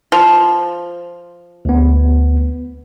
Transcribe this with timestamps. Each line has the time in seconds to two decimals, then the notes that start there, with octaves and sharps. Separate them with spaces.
0.12 F3
1.65 D2 B3